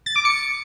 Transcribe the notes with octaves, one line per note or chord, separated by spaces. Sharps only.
A6
D6
C#7